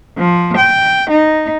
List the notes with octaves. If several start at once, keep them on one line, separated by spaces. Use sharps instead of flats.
F3
G5
D#4